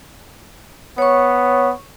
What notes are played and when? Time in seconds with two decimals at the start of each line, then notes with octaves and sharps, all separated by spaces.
0.98 B3 C#5 C#6